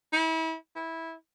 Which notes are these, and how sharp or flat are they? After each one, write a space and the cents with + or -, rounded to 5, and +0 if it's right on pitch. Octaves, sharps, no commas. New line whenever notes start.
E4 -35
E4 -10